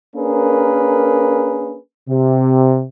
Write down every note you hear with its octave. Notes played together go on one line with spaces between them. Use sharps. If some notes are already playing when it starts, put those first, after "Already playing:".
A#3 C#4 D4 G#4 A#4 B4
C3